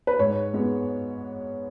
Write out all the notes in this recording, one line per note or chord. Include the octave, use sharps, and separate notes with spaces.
B4
G#2 C#5
G#3 B3